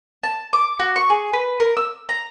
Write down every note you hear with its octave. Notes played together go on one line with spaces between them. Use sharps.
A5
D6
F#4
C#6
G#4
B4
A#4
E6
A#5